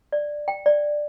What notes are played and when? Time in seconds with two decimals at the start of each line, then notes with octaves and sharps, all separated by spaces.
0.12 D5
0.48 G5
0.66 D5